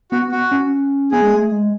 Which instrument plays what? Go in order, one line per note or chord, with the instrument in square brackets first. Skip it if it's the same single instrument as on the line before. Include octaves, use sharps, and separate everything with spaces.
[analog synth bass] B3 [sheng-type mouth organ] F#4
[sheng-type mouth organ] F#4
[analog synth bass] C#4
[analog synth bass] B3 [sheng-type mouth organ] G#4
[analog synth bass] G#3
A3
G#3